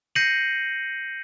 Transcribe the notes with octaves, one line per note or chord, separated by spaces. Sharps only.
G6 A#6 C7 C#7 D#7 F#7